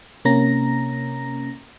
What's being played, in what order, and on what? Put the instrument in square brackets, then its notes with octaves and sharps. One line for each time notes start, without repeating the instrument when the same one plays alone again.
[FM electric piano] C3 A#3 C#4 A#5 A#6